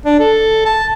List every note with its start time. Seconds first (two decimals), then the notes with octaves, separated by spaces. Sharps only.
0.05 D4
0.20 A4
0.66 A5